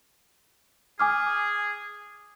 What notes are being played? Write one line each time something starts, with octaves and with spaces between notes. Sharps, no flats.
G#4 G#5 D6 F6